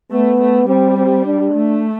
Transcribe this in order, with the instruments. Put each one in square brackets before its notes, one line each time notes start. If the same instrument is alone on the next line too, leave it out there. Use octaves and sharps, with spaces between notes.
[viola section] A3 [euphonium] B3
[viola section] A3
[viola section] G3 [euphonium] C4
[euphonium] C4
D4
[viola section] A3